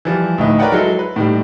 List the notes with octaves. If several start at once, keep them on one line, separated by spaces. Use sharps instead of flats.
E3 F3 G3
D2 A2 D#4 B4
A#4 B4 C#5 D5 F#5 G5
F#3 G#3 E4 A4
B4
A2 D#3 G3